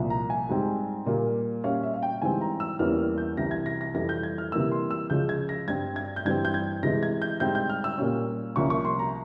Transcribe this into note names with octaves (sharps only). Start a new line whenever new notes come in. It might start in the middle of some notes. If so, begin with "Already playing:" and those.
Already playing: C2 A#2 F3
A#5
G#5
G#2 G3 C4
A#2 G3 A#3
A#2 G3 C#4 F5
E5
F5
G5
G#2 E3 G3 C4 G#5
A#5
E6
E2 E3 G3 A#3 C#4 F6
F6
G6
C2 C3 E3 A#6
G#6
A#6
A#6
F2 E3 G3 A#6
G6
G#6
F6
C3 E3 G3 A#3 E6
C6
E6
C#2 C#3 F3 G#3 C#4 G6
G#6
A#6
G2 G3 C4 G#6
G#6
G6
G2 E3 G3 C4 G#6
G6
G#6
C3 E3 G#3 A#6
G#6
G6
G#2 G3 C4 G6
G6
F6
E6
A#2 G3 C#4
C2 C3 F3 A#3 C#4 C#6
C#6
C6
A#5